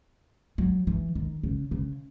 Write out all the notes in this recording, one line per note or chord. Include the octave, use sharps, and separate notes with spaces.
F#3
E3
D#3
C#3
C#3